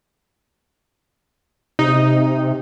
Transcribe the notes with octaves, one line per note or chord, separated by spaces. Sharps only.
C3 D#4